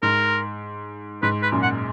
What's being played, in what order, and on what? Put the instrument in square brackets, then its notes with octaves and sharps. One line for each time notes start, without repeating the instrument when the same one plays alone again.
[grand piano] G#2 [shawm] A#4
[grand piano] G#2 [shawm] B4
[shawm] B4
[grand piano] F#2 A#2
[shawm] F#5